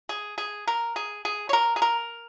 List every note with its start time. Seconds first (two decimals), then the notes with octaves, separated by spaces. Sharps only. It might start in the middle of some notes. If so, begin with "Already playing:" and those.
0.09 G#4
0.38 G#4
0.67 A#4
0.96 G#4
1.25 G#4
1.49 C#5
1.53 A#4
1.76 G#4
1.82 A#4